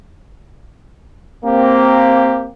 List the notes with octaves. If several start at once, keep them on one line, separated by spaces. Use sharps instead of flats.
A#3 C4 G4